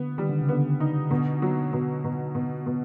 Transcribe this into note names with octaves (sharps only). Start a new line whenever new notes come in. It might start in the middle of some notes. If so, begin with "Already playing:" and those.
Already playing: D3 B3
D#3 G3
D3
C#3
D3 B3
D#4
B2 D3
F#3
B2
B2
B2
B2